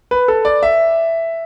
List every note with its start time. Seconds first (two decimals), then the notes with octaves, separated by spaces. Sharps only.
0.11 B4
0.28 A4
0.45 D5
0.63 E5